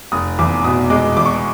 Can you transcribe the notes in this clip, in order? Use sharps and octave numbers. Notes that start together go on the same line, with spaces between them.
F1 D#6
E2 D6
B2 D#6
G#3 D6
E2 D6
C#6
D6